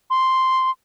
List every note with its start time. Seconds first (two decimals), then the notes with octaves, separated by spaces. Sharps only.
0.10 C6